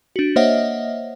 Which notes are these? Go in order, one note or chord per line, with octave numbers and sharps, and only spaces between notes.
D4 F#4
A#3 C5 C#5 D#5 E5 F#5